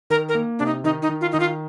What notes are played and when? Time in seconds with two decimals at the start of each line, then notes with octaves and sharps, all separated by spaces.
0.10 D#3 A#4
0.29 A#4
0.35 A#3
0.59 C3 D4
0.66 D#4
0.84 D#3 D#4
1.02 D#4
1.09 D#3
1.21 F4
1.32 D#3 D#4
1.40 F4